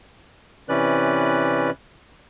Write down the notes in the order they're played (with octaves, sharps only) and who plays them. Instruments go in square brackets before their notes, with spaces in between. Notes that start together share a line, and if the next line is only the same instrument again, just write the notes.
[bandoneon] C3 E3 C#4 B4 D5 F#6